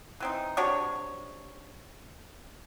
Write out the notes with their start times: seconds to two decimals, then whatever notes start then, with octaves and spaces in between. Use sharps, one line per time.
0.20 E3 C4 D#4
0.57 C3 D4 F#4 C#5